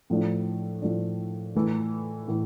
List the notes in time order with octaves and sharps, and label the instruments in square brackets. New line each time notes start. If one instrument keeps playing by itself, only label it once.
[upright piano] A2 F3 A3 D4
A2 F3 A3 D4
A2 E3 A3
A2 E3